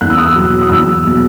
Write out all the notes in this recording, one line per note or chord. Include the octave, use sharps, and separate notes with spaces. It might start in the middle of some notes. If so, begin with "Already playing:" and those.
E2 F#6
E6
D#6
E6
B2 F#3
D#6
E2 E6
B2 F#3